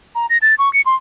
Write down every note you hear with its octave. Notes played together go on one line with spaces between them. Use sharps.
A#5
A#6
A6
C#6
C#7
C6